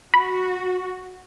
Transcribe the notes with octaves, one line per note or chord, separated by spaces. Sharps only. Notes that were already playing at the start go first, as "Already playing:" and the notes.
F#4 B5